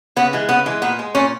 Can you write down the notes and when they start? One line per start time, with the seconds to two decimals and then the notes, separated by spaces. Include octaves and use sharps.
0.16 C#3 B3
0.33 E3 G#3
0.49 C#3 B3
0.66 E3 G#3
0.82 A#2 B3
0.99 G#3
1.15 A#2 C#4